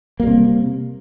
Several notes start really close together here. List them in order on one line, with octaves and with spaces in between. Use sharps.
A#3 G3 C3